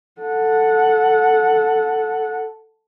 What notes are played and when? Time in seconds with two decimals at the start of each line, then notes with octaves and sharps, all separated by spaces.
0.22 A4 F#5